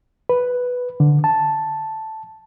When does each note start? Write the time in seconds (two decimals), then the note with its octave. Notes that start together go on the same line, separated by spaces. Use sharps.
0.29 B4
1.00 D3
1.24 A5